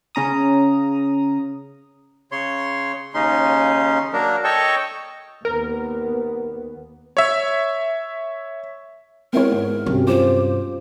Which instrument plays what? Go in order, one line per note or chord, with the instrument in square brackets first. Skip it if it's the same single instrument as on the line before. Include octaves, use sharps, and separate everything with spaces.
[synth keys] C#3 C#4 A#5 D#6
[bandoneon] C#3 C#5 C6
D#2 C#3 C#4 D#4 C6
F#3 A#3 D4 A#4
A4 C#5 D#5 G5 A5 C#6
[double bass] D#2 B3 [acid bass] A#4
[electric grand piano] C#5 E5
[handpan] G#3 B3 [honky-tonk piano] C4 E4 C#5 [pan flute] A#4
[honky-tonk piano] G#1
[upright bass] G2 C3 [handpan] F#3 C#4 G4
[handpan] F#3 F4 [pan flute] C5 [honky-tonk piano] D6